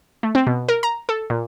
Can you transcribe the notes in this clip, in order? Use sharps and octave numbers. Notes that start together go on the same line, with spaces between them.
A3
C4
B2
A#4
A#5
A4
A#2